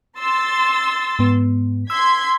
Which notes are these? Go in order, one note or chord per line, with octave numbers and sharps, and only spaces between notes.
C6 E6 A6
G#2 B3
C6 E6 G#6 B6